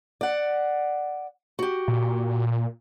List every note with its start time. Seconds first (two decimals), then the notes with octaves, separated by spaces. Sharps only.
0.21 D5 F#5
1.59 F#4 G4
1.88 A#2